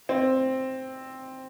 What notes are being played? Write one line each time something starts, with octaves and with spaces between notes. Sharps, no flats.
C4